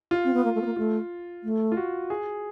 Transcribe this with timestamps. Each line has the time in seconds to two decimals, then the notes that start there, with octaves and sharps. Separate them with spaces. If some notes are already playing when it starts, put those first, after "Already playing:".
0.11 F4
0.24 C4
0.33 B3
0.44 A#3
0.55 A3
0.61 B3
0.65 A#3
0.76 A3 F4
1.43 A3
1.72 F4
1.77 F#4
2.10 G#4